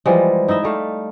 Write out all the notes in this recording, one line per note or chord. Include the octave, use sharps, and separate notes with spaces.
E3 F3 G3 G#3
D#4 E4 D#5 E5
G3 A3 F5